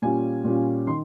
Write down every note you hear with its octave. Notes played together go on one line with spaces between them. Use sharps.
A#2 G3 C#4 F4 G#5
A#2 G3 C#4 F4
D#3 C6